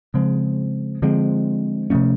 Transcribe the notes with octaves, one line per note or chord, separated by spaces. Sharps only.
C#3 F3 G#3 C4
D3 F3 G#3 C4
C3 F3 A3 C#4